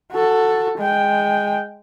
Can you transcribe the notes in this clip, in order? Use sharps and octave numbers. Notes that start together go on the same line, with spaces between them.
F#4 A4
G#3 G5